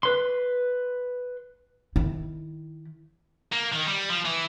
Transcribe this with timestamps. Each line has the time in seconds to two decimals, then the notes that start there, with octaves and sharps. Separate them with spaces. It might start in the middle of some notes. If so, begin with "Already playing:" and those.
0.03 B4 C6
1.96 D#3 E4
3.53 A#3
3.73 D#3
3.87 G3
4.10 F3
4.26 E3